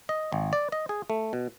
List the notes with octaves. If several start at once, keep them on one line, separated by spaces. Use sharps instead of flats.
D#5
G#1
D5
D#5
G#4
A3
B2